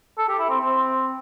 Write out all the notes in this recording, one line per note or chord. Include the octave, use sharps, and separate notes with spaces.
A4
G4
E4
C4
C4